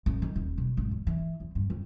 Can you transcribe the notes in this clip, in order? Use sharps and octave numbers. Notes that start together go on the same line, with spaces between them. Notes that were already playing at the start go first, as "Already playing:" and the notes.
A1
D#3
D#1
B2
G#1
E2
E3
E2
G2
F2